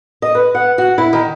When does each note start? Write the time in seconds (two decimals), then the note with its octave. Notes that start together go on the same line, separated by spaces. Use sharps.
0.22 D#5
0.35 B4
0.55 F#5
0.78 F#4
0.98 E4
1.13 D#3